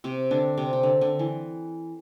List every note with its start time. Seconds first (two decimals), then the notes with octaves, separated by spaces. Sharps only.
0.04 C3 C4
0.31 D3 D4
0.57 C3 C4
0.73 C3
0.83 D3
1.01 D3
1.19 E3